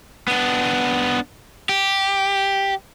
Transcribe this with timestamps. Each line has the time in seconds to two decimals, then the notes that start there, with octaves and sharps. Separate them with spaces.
0.28 B3 D4
1.69 G4